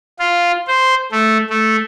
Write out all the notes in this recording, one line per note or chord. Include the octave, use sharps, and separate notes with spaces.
F4
C5
A3
A3